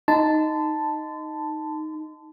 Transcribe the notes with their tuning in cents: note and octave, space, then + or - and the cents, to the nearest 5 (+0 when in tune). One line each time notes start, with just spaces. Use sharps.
D#4 +0 A5 +0 C6 -40